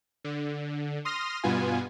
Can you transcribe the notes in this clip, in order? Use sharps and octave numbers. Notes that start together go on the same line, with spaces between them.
D3
C6 D#6 F6 A#6
G2 B2 B3 F4 G#5